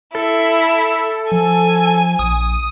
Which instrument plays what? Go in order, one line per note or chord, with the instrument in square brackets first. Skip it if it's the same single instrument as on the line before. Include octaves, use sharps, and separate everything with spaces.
[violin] E4 [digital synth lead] A4
[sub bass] F3 [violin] G#5
[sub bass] A#1 [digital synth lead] D#6